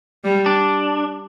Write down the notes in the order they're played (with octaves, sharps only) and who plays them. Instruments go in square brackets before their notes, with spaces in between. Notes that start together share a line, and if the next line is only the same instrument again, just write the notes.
[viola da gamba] G3
[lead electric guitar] D4